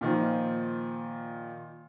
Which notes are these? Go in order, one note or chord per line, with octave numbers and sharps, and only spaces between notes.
A#2 D#3 F3